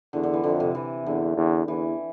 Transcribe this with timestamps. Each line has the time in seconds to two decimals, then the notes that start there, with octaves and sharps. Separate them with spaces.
0.13 E2 D3
0.23 D3
0.34 E3
0.44 F2 D3
0.60 C3
0.75 E3
1.06 E2 D3
1.37 E2
1.67 E2 E3